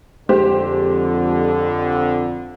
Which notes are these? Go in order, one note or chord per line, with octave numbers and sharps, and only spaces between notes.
F2 D3 G#3 G4 C5